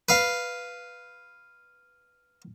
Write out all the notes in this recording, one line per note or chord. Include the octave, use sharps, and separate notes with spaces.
B4 F5